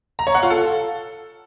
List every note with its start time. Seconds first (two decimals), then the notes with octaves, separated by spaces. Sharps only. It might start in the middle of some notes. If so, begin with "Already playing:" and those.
0.19 A#5
0.27 C#5
0.35 F#5
0.42 F4
0.50 A4